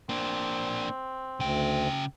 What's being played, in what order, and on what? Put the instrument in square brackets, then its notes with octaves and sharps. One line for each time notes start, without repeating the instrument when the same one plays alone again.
[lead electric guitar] A#3 D4 [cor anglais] C4
[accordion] D2 [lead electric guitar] C#3 G5